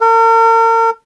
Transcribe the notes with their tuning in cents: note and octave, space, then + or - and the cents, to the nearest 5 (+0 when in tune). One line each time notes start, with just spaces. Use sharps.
A#4 -40